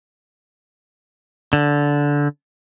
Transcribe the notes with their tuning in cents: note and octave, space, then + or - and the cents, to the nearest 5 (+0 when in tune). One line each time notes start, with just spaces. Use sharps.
D3 -15